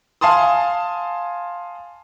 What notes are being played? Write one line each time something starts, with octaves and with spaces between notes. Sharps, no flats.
F5 G#5 A5 C6 D#6